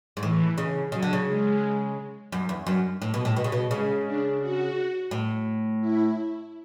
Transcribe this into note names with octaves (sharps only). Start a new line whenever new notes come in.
G#2
A2 E3
C#3
C#3 F#3
D3
C#3
G#3
F#2
E2
F#2
A2
B2
A2
B2
C#3
B2
C#3 G#3
D4
F#4
A2
E4